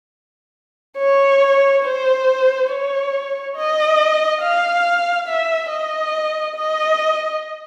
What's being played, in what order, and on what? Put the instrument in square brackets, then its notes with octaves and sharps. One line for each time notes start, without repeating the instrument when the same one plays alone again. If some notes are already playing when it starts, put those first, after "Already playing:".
[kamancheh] C#5
C5
C#5
D#5
F5
E5
D#5
D#5